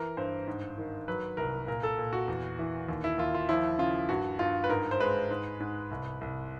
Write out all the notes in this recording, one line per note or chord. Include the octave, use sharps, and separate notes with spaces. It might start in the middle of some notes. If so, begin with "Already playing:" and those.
Already playing: E3 A#4
G2 C5
G#2
D#3
F#3 B4
C2 A#4
A#2 A#4
A4
A#2
F#4
E2
E3
D#2
E4
D#2 F4
F4
F3 E4
C#3 F4
G2 F#4
G2 F4
B4
G#2 A#4
C5
G#3 B4
G#2
G#2
C2
C2